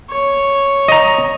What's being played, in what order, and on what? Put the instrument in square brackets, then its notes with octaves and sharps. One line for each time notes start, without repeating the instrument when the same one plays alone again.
[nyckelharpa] C#5
[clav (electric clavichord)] D#5 A#5